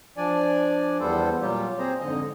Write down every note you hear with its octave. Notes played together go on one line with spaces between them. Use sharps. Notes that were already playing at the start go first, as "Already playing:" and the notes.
F3 D4 D5 G#5
E2 G3 B3 A4 C5
A#2 F#3 G3 F4 G4
C4 G#4 C5 A#5
F2 G#2 D3 D#5